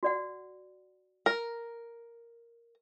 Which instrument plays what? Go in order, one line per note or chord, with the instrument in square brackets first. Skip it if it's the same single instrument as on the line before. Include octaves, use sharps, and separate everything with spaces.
[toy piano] F#4 D5 F#5
[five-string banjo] A#4